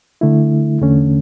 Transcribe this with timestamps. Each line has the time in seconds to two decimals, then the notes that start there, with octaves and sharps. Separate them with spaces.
0.21 D3 A3 E4
0.81 E2 D3 A3 C#4